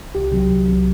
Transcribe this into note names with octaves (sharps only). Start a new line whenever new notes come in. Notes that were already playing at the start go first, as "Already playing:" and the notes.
C2 G4
C3 F#3
C2
C3 F#3